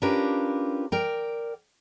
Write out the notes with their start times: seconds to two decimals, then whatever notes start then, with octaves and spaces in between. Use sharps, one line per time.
0.02 C#4 D4 F4 G4 A#4 B4
0.92 A#4 D5 G5